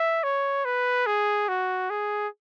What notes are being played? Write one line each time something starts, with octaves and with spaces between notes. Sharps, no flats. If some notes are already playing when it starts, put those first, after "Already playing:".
Already playing: E5
C#5
B4
G#4
F#4
G#4